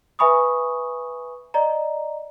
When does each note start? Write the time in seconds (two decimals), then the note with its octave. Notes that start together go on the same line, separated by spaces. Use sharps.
0.19 B4 E5 G#5 B5 C#6 D#6
1.54 D5 D#5 A#5